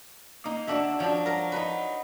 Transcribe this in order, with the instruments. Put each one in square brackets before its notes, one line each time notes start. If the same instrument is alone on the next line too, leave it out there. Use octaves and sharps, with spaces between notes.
[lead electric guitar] A#3 [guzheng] D#4
[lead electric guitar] D3 [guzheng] D4 F#4 E5
[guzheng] F3 D4 [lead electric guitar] C#5 F#5
[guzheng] A#4 A#5
D#4 B4